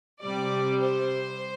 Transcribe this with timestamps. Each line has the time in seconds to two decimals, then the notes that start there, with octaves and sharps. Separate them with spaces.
0.23 C3 G3 D5
0.82 C5